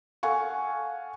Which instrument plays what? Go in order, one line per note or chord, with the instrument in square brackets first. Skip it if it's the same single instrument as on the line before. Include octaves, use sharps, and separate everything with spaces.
[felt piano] A4 F5 F#5 G#5 C#6